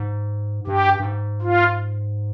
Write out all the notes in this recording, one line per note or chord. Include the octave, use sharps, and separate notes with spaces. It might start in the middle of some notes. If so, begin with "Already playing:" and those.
Already playing: G#2
G2 G4
G2
G#2
F4